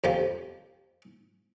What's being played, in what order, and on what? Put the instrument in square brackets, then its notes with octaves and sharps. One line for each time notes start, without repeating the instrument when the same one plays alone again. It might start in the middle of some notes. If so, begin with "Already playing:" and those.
[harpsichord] F2 F3 G4